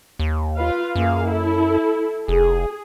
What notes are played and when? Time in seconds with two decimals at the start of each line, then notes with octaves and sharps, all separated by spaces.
0.19 D#2
0.56 F4 B4 F5
0.95 F#2 A#3 G#4 F5
1.27 E4 A4
2.28 F1 G#4